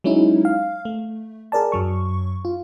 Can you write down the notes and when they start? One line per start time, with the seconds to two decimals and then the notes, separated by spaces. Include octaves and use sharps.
0.04 F#3 G#3 C#4 D#4 E4
0.45 F5
0.85 A3
1.52 G#4 A#4 D5 A5
1.72 F#2 F#3 C#6
2.45 F4